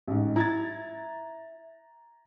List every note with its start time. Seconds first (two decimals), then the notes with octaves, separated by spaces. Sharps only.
0.07 A1 G#2
0.36 E4 A#5 G#6 A6